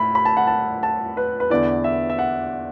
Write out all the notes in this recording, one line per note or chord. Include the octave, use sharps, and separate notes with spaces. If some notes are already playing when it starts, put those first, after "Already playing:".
Already playing: A2 E5 B5
B5
A5
F#5
A5
A5
B4
B4
E2 D3 B3 E4 D5
E5
E5
F#5